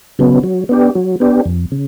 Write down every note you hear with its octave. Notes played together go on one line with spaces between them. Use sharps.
C#3 F#3 B3
F#3
B3 D4 G4
F#3
B3 D4 G4
F2
C#3